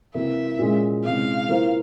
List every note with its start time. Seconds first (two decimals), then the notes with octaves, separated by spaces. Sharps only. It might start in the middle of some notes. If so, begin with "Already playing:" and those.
0.14 C3 E3 A#3 E4 E5
0.59 A#2 G#3 C#4
1.04 C3 E3 G#3 C#4 F5
1.49 E3 A#3 F4 C5